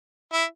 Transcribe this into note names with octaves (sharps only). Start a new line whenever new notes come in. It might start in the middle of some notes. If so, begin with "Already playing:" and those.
E4